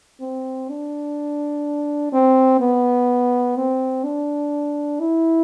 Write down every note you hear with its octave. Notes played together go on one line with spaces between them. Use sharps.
C4
D4
C4
B3
C4
D4
E4